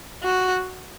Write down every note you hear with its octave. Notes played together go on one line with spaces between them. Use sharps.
F#4